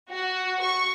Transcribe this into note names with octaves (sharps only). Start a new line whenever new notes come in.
F#4
C#6